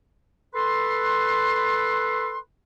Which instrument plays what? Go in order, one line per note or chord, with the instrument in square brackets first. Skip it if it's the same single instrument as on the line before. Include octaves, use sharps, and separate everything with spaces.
[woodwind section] A4 B4 C6